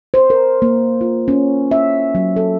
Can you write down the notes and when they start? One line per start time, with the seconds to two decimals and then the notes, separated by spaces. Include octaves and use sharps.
0.14 C5
0.30 A#4
0.62 A#3
1.01 F4
1.28 C#4
1.71 E5
2.15 F#3
2.36 A4